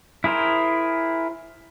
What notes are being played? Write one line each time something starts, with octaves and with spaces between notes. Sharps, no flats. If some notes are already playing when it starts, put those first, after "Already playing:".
E4 G#4 A#4 C5